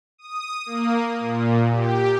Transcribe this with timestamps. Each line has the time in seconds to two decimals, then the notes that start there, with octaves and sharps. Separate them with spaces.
0.18 D#6
0.66 A#3
1.19 A#2
1.71 G4